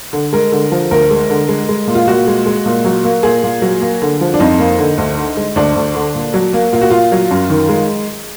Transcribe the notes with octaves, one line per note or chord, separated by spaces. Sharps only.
D3
G#3 A#4
D3
F3
D2 A#4
G#3
D3
G#3
G#3
A#2
F4
A#2 F#4
G#3
G#3
A#2
F#3
A#3
A#2 G#4
A#2
F#3
A#3
D3
F3
D4
F2 D#4
A#3
D3
D2
D3
G#3
D2 D4
D2
D3
A#2
F#3
A#3
A#2 F4
F#4
A#2 F4
F#3
F#2
D#3
G#3